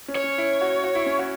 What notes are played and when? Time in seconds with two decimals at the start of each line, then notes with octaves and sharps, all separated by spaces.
0.08 C#4
0.15 C#5
0.24 C#4
0.38 E4
0.61 F#4
0.83 F#4
0.95 E4
1.06 C#4
1.19 F#4